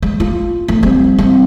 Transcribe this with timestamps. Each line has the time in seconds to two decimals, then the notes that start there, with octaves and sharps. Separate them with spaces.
0.02 G#3
0.20 F4
0.68 A3
0.83 G3 C4
1.18 G3 C4